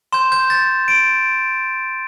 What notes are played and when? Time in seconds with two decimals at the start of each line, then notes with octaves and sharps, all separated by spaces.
0.12 C6 G6 E7
0.32 G6
0.50 A6
0.88 D7